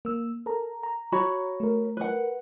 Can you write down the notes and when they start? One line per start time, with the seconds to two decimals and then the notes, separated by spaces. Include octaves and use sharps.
0.05 A#3 E6
0.46 A4 A#4 A#5
0.83 A#5
1.12 F#4 C#5 B5
1.60 A3 A#4
1.97 B4 F#5